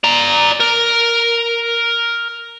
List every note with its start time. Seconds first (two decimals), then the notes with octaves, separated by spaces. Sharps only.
0.04 D5 A#5
0.60 A#4